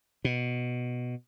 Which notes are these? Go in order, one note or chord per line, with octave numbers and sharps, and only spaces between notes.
B2